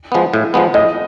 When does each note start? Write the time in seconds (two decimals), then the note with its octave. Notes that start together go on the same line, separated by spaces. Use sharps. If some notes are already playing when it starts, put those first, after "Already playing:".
0.12 F3 G#3 B3
0.33 A2
0.54 F3 G#3 B3
0.74 A2 D#5